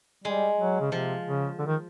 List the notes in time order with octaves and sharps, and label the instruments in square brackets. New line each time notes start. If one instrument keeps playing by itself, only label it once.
[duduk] G3 [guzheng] G#3
[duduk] F#3
C#3
[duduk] C3 [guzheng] F3
[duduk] C#3
D3
D#3